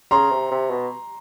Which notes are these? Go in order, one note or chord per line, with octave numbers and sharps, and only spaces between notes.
C#3 A#5 C6
C3
C3
B2